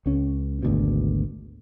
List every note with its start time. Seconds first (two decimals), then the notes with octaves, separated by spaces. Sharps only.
0.06 C#2 C#4
0.63 G#1 D2 B2